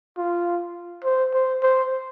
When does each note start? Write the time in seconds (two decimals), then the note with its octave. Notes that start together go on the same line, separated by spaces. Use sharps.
0.18 F4
1.04 C5
1.34 C5
1.63 C5